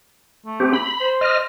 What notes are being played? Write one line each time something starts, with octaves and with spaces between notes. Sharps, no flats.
A3
C4 G4
B5
C5
D#5 F6